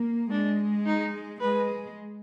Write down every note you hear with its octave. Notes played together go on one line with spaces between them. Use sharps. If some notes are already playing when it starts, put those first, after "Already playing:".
Already playing: A#3
G#3 D4
D#4
G#3 B4